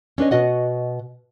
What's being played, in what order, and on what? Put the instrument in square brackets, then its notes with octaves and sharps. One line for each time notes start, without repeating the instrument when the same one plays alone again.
[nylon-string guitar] C#4 D4 B4 D#5
B2 F#4 D#5 F#5